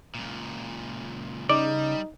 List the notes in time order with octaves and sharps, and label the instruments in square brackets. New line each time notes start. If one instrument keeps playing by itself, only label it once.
[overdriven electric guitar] C#2 A#2
[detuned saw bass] C#3 [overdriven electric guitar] G3 [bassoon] D#4 [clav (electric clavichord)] D5